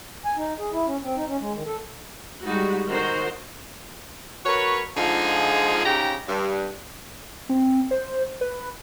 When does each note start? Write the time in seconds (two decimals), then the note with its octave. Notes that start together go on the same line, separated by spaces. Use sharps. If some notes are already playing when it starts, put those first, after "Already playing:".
0.25 G#5
0.37 D#4
0.59 G#4
0.73 E4
0.86 C#4
1.03 C4
1.16 D#4
1.28 C#4
1.40 G#3
1.55 D#3
1.66 A4
2.44 G3 G#3 D#4 F#4
2.89 D#3 F#4 C5 A#5 C6
4.45 F#4 A#4 B4 C#5
4.97 D3 F3 G#3 D#4 F4 G#4
5.85 G#2 C#3 D#4 G4 G5 A#5
6.28 G2
7.49 C4
7.91 C5
8.41 B4